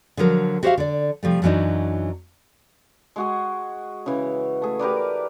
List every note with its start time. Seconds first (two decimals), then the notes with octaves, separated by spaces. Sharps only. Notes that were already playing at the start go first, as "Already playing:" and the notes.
0.17 D3 F3 F#3 A#4
0.63 F#4 G4 C5 D5 E5 F5
0.78 D3 D5
1.23 C3 F3 G3 A3
1.42 F#2 E3 F#3 A3 D4 D#4
3.16 G#3 F#4 G#4
4.06 C#3 E3
4.62 A3 G#4
4.79 G4 A#4 B4 D5